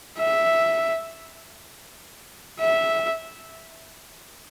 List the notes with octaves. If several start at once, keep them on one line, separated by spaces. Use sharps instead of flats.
E5
E5